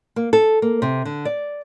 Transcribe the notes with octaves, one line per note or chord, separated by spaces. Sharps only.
A#3
A4
A#3
C3
D3
D5